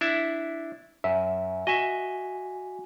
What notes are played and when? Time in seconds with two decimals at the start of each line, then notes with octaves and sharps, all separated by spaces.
0.01 D4 E4 E5
1.04 F#2 E5
1.67 F#4 D#5 E5 G#5